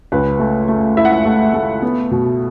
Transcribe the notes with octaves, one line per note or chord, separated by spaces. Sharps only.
C#2 B4
A3
A3
E4 E5
F#5
E5
A3
A3
B3
B2